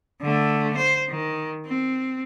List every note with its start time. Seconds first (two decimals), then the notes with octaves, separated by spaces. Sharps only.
0.21 D3 A3
0.77 C5
1.09 D#3
1.66 C4